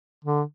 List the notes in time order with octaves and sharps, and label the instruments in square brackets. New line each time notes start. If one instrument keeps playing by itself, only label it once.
[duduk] D3